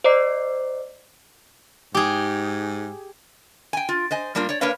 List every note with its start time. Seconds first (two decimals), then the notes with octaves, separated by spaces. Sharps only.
0.04 C5 D5 D#5 A#5 D6 C7
1.95 G#2 G4 G#4
3.73 G5 G#5
3.89 F4
4.11 C5 D#5 G#5
4.35 A2 G3 A#3 D4 F4
4.49 C#5 D5
4.61 A#3 D4 A#4 B4 C#5 F5